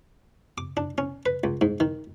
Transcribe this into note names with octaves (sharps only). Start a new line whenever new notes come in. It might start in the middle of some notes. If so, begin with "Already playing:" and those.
D6
D4
C#4
B4
C#2
G#2
D#3